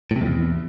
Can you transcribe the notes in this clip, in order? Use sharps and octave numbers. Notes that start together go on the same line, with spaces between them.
A2
C3
F2
E2